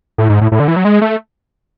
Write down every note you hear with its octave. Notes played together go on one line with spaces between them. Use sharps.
A2
G#2
A2
A2
D3
E3
F#3
G#3
A3